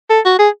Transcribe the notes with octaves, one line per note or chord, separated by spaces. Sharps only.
A4
F#4
G#4